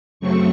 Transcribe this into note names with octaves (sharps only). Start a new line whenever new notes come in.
F#2 C#3 F#3 A3 C4 C#6